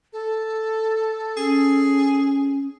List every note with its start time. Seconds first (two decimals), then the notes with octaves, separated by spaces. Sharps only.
0.13 A4
1.37 C#4 G#4